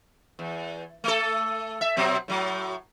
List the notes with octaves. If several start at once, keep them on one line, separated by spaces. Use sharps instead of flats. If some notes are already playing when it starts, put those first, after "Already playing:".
E2
A3 A4
E5
B2 F#3 C4
A2 F#3